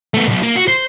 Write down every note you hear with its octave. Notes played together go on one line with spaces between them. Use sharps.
A3 B3
B1 B2
A#3
F#4
C5